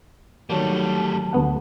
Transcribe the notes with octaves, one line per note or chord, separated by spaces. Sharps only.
D#3 F#3 G3 A3 A#3 A5
D2 B3 F#5